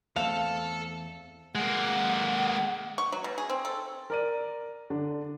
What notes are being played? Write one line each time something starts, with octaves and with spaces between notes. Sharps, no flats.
E2 A3 C4 A4 F5 A5
G#3 A#3 F#5
C#6
F#3
B2
G#4
C4
A4
A#4 D5 D#7
D3 D4